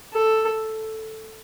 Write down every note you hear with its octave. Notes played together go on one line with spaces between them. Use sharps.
A4